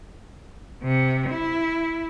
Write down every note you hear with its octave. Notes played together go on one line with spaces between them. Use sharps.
C3
E4